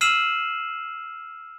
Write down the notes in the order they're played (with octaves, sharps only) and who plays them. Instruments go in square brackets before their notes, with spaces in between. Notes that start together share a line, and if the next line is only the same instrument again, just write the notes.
[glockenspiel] E6 F6 C7 D#7 E7 F#7